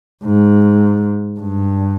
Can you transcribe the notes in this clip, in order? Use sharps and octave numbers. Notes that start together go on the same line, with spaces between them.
G#2
G2